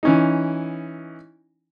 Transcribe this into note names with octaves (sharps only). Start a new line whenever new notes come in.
E3 C#4 D#4